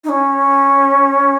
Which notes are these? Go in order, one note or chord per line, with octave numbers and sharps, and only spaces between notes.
D#4
C#4